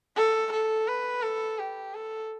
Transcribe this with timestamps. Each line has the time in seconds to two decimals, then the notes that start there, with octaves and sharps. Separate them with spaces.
0.16 A4
0.52 A4
0.87 B4
1.23 A4
1.59 G4
1.94 A4